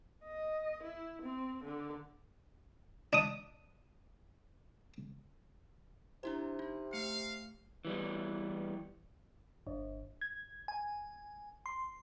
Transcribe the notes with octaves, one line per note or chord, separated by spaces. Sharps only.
D#5
E4
C4
D3
D4 D#6
C3 D4 E4 C5
D#4
A3 F5 C#7
E3 G3 B3
G1
G#6
G#5
C6